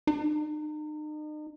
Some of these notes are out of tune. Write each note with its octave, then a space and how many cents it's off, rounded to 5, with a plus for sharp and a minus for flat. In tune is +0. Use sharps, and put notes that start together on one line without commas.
D#4 -40